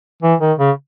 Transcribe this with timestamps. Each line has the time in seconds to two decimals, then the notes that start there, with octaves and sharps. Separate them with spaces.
0.22 E3
0.40 D#3
0.59 C#3